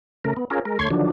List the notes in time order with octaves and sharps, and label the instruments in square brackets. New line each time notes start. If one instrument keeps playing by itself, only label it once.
[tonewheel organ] C#3 A3 A#4
B3
C#4 F4 G#4 A#4
G#3 A#4
D2 A3 C#5 C6 G#6
D3 D#3 F3 F#3 D4